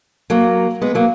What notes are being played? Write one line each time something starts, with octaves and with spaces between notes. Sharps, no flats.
F#3 A#3
G#3 B3
F#3 A#3